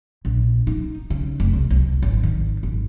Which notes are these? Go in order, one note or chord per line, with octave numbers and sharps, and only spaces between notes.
A#1
D#4
C#3
F1
C2
C2
G#1
D#3
G#1